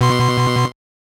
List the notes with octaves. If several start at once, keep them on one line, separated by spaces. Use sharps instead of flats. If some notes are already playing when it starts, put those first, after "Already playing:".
B2 C6